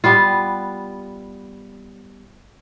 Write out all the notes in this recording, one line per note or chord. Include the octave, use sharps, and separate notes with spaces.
G3 B3 F4